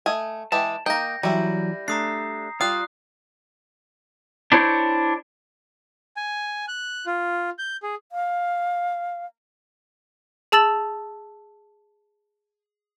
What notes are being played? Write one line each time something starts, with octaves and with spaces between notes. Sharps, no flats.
A3 D#5 G#5
E3 G#3 G4 A5
A#3 D#4 G5 G6 A#6
E3 F#3 G3 E4
A3 D4 A#5 D#6 C7
G3 F4 D#6 F#6
D4 E4 C5 C#5
G#5
F#6
F4
G6
G#4
F5
G#4 A5 E6 A6 F#7